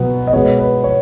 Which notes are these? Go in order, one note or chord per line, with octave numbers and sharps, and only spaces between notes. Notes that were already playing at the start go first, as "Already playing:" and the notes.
Already playing: B2 F#3 B3
D#5
B2 G#3 B3 C#5
B4
C#5